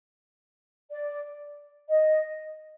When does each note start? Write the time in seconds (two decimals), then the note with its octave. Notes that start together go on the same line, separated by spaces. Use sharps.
0.90 D5
1.89 D#5